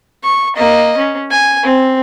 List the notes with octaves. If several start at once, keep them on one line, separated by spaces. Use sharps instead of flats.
C#6
A#3 D#5
C#4
G#5
C4